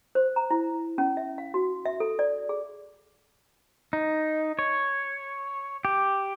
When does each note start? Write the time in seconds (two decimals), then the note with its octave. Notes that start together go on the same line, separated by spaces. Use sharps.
0.15 C5
0.36 A#5
0.51 E4
0.98 C#4
1.17 E5
1.38 F5
1.54 F#4
1.86 E5
2.00 A4
2.19 D5
2.49 G#4
3.93 D#4
4.59 C#5
5.85 G4